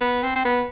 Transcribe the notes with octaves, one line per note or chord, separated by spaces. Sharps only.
B3
C4
C4
B3